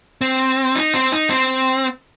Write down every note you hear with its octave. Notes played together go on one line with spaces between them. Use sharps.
C4
D#4
C4
D#4
C4